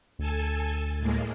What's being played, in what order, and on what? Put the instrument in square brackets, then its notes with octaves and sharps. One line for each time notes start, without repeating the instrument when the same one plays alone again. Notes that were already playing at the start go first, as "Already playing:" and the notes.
[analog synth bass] D2 [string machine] A4 G#5 A5
[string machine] A2 G#3 A#3